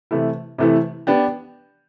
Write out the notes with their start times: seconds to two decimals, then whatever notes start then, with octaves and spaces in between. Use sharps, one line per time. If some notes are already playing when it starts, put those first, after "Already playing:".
0.11 C3 E3 A3 E4
0.58 C3 E3 A3 E4
1.07 B3 D4 G4